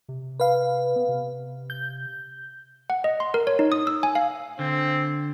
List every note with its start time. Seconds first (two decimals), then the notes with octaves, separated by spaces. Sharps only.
0.09 C3
0.40 B4 F5
0.96 B3
1.09 C3
1.70 G6
2.90 F#5
3.04 D#5
3.20 C6
3.34 A#4
3.47 C#5
3.59 D#4
3.72 D#6
3.87 E6
4.03 G#5
4.15 F5
4.59 D3 C4